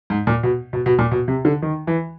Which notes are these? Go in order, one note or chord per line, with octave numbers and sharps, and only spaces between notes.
G#2
A#2
B2
B2
B2
A#2
B2
C3
D3
D#3
E3